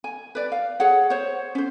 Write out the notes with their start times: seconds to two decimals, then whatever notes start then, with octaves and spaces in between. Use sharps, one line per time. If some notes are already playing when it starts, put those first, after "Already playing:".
0.04 G#5
0.35 B4 D5
0.52 F5
0.80 G#4 C#5 F#5
1.10 C5 C#5
1.55 C#4 C5